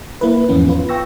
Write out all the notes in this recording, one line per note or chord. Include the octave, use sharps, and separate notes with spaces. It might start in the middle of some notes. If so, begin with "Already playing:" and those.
A#3 E4 B4
E2 G#2 E3 F3 B3 C#4
B3 F4 B4
G5 C#6 E6 A#6